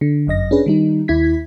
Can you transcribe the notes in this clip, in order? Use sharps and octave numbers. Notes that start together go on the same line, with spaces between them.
D3
G1 F#2 D#5 A#6
C#4 D4 G#4 B4
D#3 G3 D#4
D#2 E4 G#6 B6